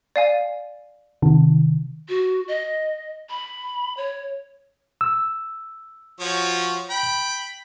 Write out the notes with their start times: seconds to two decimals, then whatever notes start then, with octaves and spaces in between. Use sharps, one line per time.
0.16 D5 F5 G#5
1.22 C3 D#3
2.09 F#4
2.48 D#5
3.29 B5
3.97 C#5
5.01 E6
6.20 F3 F#4 C#5
6.90 G5 B5